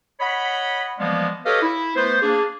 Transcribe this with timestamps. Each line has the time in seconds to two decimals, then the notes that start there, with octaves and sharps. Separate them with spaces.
0.20 C#5 D#5 F#5 B5
0.99 E3 F3 G3 G#3 A#3 B3
1.46 G4 A4 B4 C#5 D#5 F5
1.62 E4
1.96 A3 B3 B4 C5
2.22 A#3 D4 G#4